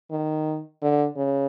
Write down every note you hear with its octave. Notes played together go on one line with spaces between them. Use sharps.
D#3
D3
C#3